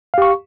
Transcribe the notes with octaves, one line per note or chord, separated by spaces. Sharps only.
G4 F5 C#6